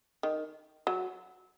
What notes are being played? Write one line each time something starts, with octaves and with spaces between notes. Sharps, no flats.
D#3
F#3